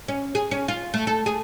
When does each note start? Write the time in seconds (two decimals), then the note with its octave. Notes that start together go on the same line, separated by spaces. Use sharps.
0.08 C#4
0.35 G#4
0.51 C#4
0.68 F4
0.94 A3
1.07 A4
1.26 G#4